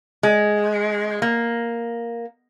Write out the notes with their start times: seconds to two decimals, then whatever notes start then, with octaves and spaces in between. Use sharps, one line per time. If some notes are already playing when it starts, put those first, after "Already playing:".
0.23 G#3
1.22 A#3